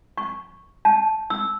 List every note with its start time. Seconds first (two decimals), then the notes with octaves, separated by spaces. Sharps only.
0.18 C#6
0.85 A5
1.30 E6